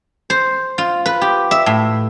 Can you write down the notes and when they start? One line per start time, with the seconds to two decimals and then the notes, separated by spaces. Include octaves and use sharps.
0.30 C5
0.78 F4
1.06 B4
1.21 G4
1.51 E5
1.66 A2